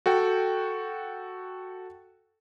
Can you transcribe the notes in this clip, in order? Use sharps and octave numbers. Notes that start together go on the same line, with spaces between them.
F#4 A4 G5